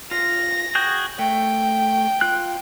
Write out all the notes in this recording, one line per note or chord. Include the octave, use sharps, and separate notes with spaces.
F4 A#6
F#4 G#4 G5
A3 G5
F4 F#6